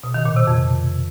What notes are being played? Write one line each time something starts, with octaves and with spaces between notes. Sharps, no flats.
B2
D#3
A#2
C3
F2